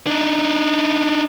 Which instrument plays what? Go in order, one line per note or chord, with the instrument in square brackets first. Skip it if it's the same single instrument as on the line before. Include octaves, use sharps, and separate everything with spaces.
[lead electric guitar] D4 D#4